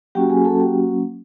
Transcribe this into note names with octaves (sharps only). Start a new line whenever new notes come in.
F#3 A#3 C#4 F#4 G4 G5
G#4 G#5
A4 A5
G4 G5